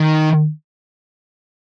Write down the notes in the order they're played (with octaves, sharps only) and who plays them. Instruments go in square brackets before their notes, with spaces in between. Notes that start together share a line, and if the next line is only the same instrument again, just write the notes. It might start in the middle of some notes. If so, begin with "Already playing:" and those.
Already playing: [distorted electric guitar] D#3